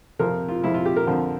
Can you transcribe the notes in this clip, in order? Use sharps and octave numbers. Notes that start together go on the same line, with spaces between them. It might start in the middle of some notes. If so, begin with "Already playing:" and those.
F2 C3 F3 A#4
F4
F2 C3 F3 E4
F4
G4
A#4
F2 D3 F3